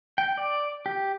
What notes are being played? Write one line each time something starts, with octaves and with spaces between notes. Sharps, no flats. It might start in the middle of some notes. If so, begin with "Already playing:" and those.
G5
D5
G4